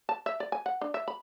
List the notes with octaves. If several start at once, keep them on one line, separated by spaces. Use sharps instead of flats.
A5
E5
D5
G#5
F#5
D4
E5
B5